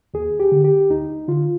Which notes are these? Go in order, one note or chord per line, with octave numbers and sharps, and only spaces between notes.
D#2 G#4
G4
D3
G4
D2 D#4
D3 F4